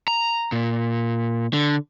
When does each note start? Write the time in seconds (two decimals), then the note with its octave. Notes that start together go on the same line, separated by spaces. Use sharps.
0.08 A#5
0.52 A#2
1.53 D3